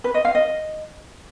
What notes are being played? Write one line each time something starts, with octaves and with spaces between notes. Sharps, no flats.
B4
D#5
F5
D#5